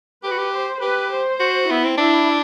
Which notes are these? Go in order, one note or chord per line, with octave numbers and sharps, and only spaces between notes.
G4 B4
F#4
G4
C5
G4 B4
C5
F#4
B3 E4
C4
D4 E4